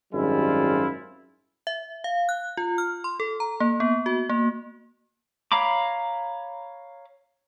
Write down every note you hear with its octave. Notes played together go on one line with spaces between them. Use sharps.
G#1 F#2 G3 G#3 E4 F4
E5
F5
F#6
F4
F6
C6
A4
A#5
A#3
B3
F#4
A#3
C#5 F5 A#5 B5 D6